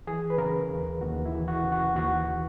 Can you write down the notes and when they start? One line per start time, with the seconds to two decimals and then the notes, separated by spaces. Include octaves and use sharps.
0.07 E3 G#4
0.30 B4
0.38 C#3 A#4
0.70 D#2
1.01 D#2 F#4
1.25 E4
1.33 E3
1.48 F#4
1.64 C#3
1.72 F#4
1.95 D#2 F#4